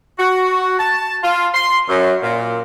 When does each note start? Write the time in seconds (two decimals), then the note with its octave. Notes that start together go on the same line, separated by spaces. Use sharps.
0.19 F#4
0.79 A5
1.23 F4
1.54 C6
1.89 F#2
2.23 A#2